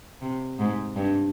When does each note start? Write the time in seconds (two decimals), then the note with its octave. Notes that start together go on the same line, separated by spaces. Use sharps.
0.21 C3
0.59 G#2
0.96 G2